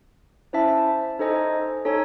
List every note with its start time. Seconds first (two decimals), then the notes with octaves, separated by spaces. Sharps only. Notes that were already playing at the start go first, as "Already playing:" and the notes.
0.53 C#4 E4 C5 E5 A5
1.19 D#4 A4 C5 D#5 G#5
1.85 D#4 A4 C#5 G#5